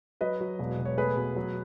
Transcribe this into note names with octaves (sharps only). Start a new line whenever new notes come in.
F#3 B4 D#5
F#3
E1
E1
C#5
A3 G#4 B4
B2
F#3